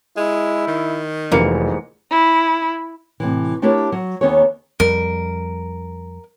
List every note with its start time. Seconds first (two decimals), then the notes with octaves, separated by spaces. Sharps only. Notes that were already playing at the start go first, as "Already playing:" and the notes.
0.17 G#3 E4
0.68 D#3
1.32 F1 G#2 E3 A#3 C#7
2.10 E4
3.20 A2 C3 E3
3.62 A3 D4 E4 G4 A#4 C#5
3.92 F#3
4.21 D#2 D#3 B3 C#4 G#4 C#5
4.80 F2 G3 A#4